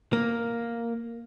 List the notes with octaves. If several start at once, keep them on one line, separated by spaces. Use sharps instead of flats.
A#3